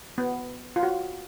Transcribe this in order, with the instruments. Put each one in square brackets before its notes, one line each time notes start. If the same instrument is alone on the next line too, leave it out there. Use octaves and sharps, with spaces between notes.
[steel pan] B3
F4
F#4